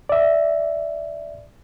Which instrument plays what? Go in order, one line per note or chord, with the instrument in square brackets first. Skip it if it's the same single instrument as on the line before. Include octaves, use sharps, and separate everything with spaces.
[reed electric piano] D5 E5